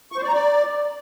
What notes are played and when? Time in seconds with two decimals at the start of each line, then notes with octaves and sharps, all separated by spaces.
0.12 C#6
0.17 C5
0.23 D5
0.28 A#5
0.33 D5